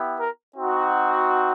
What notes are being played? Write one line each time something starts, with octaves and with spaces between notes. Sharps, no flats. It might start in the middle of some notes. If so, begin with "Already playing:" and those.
Already playing: B3 E4 G4
A#4
C4 D#4 F#4